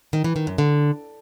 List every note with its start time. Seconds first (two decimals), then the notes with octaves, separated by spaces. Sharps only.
0.13 D#3
0.24 E3
0.36 D#3
0.47 F#2
0.58 D3